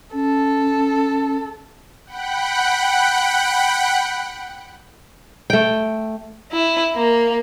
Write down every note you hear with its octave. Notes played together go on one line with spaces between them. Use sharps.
C#4 A4
F#5 G5 B5 F#6
A3 G5
E4
A#3